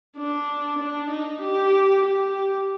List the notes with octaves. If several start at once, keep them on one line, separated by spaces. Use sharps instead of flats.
D4
D4
D#4
G4
G4